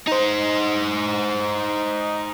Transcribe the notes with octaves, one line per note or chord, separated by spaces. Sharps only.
D#4 C5